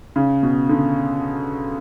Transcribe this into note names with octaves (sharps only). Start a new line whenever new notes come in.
C#3
B2
D3